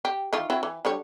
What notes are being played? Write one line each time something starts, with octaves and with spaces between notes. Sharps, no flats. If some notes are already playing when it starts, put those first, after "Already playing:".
G4
D#3 E3 F4
C4 E4 F#4
E3
D3 G3 C#5